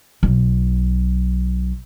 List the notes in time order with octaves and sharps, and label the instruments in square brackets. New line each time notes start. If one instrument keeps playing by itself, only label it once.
[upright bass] B1 F#3